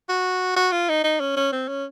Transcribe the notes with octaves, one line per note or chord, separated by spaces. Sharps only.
F#4
F#4
F4
D#4
D#4
C#4
C#4
C4
C#4